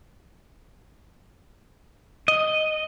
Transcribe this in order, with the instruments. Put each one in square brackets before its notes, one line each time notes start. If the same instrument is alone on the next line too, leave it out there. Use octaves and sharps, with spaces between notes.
[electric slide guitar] D#5